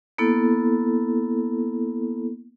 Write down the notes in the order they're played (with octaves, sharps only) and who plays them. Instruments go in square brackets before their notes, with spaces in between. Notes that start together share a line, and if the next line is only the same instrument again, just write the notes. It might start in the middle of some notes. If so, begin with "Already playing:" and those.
[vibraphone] A#3 B3 E4 A4